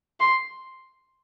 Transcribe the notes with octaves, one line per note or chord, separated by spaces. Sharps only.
C6